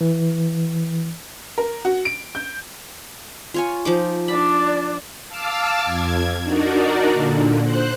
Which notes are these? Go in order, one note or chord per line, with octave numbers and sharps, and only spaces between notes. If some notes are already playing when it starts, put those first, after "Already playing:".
E3
A#4
F#4
D7
G6
F4 C#5 G#5
F3 D#4 D6
D4 D5 B5
F5 A5 D6 E6 F6
F2 G#6
D4 D#4 F#4 A#4 D5
A#2 D3
C5 F#6